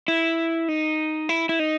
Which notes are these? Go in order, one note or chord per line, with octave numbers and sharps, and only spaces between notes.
E4
D#4
E4
E4
D#4